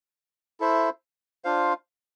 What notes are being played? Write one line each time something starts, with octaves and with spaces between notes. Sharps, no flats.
E4 A4 C5 E5
D4 F4 C5 F5